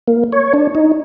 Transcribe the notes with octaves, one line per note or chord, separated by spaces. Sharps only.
A#3
C#5
D4
D#4